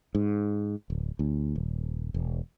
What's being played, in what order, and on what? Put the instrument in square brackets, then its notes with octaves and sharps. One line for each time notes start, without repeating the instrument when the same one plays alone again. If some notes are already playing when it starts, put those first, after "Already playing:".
[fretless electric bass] G#2
D1
D2
D#1
E1